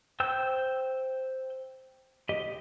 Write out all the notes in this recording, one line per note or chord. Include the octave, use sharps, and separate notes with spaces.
C5 G5 E6 G6
G4 D#5